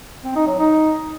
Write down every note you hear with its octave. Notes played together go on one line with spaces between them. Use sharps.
C4
D#4
F#3
D#4